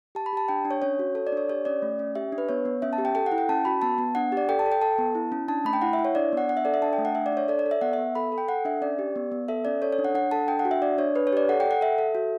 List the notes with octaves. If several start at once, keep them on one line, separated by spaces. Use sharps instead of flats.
G4 A5
B5
G4 A5
D4 G5
D4
C#5
C#4 C#5
F#4
A4 C#5
D5
D4 C#5
G4 C#5
C#4 D5
A3
C#4
G4 E5
D4
B4
B3 C#5
B3
C#4 E5
A5
G4
G5
A4 G5
F#5
E4
G5
C#4 A5
F#4 B5
B3 A5
B3
D4 F#5
G4 D5
A4 G5
A5
A4
G5
A4 A5
B3
E4
C#4
D4 A5
A3 B5
G5
E4 F#5
E5
E4
C#5
D4 D5
B3 F#5
D4 F#5
E5
A4 D5
E5
D4 A5
G5
A3
F#5
D4 E5
D5
D4 C#5
A4 D5
D5
A4
E5
B3 F#5
B3 E5
A4 B5
A4
G5
A4 F#5
D4 E5
C#4 D5
G4
B3
B3
A4 E5
C#4 D5
A4 C#5
C#5
D4
F#5
D4 F#5
A4 A5
D4 G5
F#5
F#4
E5
D4 D5
D4 C#5
D4 B4
C#5
G4 D5
A4 F#5
G5
A4 F#5
A4 E5
A4
F#4